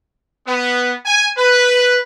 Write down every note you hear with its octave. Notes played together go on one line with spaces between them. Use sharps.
B3
G#5
B4